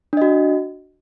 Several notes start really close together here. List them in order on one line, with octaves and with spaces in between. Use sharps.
D4 D#5 F#4